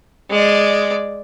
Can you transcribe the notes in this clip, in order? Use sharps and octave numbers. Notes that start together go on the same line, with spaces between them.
G#3 D5